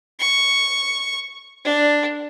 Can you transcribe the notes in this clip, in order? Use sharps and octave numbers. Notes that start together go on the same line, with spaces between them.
C#6
D4